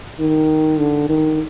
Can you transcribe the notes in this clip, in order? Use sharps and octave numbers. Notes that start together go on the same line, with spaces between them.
D#3
D3
D#3